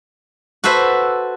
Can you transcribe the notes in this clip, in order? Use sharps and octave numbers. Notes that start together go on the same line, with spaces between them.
F#4 A4 B4 C5 E5